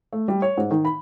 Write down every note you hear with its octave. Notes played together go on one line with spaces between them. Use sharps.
A3
G3
C#5
G#2
D#3
B5